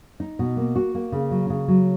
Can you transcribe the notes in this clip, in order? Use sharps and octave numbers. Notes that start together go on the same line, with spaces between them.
D#4
B2
A#3
F#4
A#3
C#3
F#3
C#3
F#3